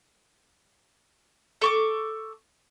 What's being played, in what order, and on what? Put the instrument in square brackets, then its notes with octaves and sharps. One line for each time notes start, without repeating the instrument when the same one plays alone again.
[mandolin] A4 C#6 D6